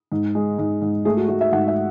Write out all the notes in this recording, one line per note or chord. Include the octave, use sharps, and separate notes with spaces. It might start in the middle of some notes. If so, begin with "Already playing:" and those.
G#2
G#3
G#2
G#2
A3 G#4
F#4
A3 F#4
E5
G#2 F#5
E5